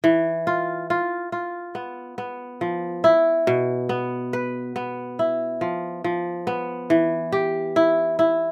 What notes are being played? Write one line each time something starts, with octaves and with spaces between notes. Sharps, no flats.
E3
F4
F4
F4
B3
B3
F3
E4
B2
B3
B4
B3
E4
F3
F3
B3
E3
G4
E4
E4